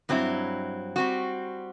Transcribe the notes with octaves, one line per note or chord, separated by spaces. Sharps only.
G2 F#3 C4 E4
G3 C4 F#4